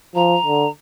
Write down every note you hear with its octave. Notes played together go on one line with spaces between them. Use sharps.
F3 A#5
D3